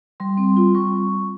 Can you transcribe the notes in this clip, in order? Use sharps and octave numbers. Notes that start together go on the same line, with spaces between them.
G3 C6
C4
F4
G3 C#6